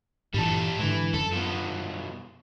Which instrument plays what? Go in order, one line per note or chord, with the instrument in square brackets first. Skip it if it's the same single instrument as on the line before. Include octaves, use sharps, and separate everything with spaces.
[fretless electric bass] G2 A#2 E3 [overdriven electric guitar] G3 A4
[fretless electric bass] G#2 D3 [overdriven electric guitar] E3
[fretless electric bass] F#2 [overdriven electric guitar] A4
[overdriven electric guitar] B2 F3